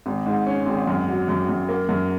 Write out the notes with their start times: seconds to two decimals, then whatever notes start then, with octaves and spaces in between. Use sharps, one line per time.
0.06 G#1
0.26 G#2
0.46 C#4
0.66 G#1
0.87 F#2
1.08 F#3
1.29 F#2
1.49 F#2
1.69 A#3
1.89 F#2